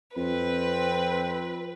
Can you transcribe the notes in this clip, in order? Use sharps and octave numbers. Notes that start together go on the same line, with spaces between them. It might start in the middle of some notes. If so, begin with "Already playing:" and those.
F2 C4 B4